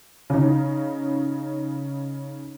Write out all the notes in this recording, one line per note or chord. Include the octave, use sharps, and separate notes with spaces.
C#3 D#4